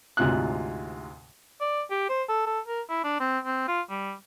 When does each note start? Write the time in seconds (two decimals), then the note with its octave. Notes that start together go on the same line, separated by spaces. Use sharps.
0.17 D2 G#2 C3 F4 F6 F#6
1.61 D5
1.91 G4
2.09 C5
2.29 A4
2.47 A4
2.68 A#4
2.89 E4
3.04 D4
3.20 C4
3.45 C4
3.68 F4
3.90 G3